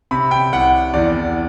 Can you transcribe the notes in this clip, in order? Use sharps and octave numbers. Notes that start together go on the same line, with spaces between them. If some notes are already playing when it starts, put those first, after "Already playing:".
C3 B5
G5
C2 F#5
E2 D5